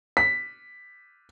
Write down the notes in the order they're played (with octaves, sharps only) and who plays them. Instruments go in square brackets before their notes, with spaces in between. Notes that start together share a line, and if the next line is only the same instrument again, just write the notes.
[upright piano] B6